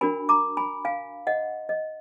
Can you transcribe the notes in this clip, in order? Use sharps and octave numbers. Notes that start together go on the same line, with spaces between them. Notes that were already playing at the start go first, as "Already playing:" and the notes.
D4 F#4 A#4 G#5 B5
A#5 D6
G#5 B5
F5 G#5
D#5 F#5
D#5